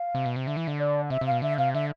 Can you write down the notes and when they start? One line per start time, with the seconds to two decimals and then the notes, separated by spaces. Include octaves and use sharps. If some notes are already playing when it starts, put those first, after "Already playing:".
Already playing: F5
0.15 C3
0.26 B2
0.36 C3
0.46 D3 E5
0.57 E3
0.67 D3
0.78 D5
1.10 C3 E5
1.21 C3 F5
1.31 B2
1.42 D3 E5
1.58 C3 F5
1.74 D3 E5